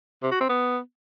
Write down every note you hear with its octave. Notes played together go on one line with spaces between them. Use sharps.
C3
F#4
C4
B3